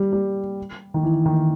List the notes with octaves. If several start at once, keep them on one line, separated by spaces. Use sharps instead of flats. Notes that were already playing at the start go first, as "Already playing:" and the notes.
Already playing: G3
G3
D#3
E3
D#3